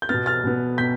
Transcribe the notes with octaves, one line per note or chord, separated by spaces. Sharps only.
G6
B2 B3 F6 A6
F6 A6
B2 B3
B2 G6 B6